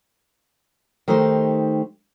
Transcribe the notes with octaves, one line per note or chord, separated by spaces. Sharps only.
D#3 A3 D#4 G4 C5